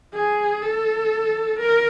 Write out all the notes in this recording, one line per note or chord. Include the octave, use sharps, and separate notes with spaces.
G#4
A4
A#4